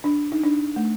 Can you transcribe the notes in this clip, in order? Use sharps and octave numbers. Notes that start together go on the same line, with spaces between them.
D4
D#4
D4
A3